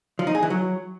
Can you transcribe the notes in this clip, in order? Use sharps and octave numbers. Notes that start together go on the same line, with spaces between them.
F3
D#4
G#4
E3
F#3